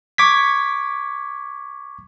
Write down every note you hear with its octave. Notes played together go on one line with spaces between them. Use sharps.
C#6 D6 G#6 B6